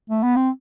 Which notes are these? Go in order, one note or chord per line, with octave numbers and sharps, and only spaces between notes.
A3
B3
C4